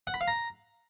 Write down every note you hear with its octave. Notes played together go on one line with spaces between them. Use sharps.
F#5
B5
F5
A#5